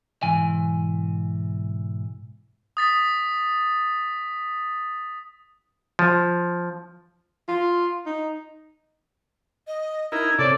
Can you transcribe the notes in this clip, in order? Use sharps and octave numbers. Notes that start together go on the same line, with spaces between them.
B1 G#2 E3 G#5
D#6 A6 B6
F3
F4
D#4
D#5
D#4 E4 A#4 G#6
C3 A4 C#5 D5